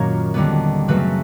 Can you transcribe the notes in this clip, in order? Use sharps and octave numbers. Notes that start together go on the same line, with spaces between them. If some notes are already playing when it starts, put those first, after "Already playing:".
Already playing: F#2 A#2 D#3 F#3 A#3 C#5
D#2 D3 G3 B3
F#2 C#3 F#3 A3 C4 B4